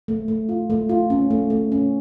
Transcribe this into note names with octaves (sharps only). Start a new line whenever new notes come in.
A3
A3
F4
A3
F4
C#4
A3
A3
C#4